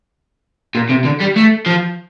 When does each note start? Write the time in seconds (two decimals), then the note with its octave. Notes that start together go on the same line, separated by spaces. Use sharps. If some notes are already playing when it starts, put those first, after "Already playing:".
0.75 A#2
0.89 C3
1.04 D3
1.20 G3
1.36 A3
1.66 F3